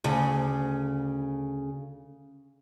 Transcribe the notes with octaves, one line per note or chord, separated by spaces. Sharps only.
D2 C#3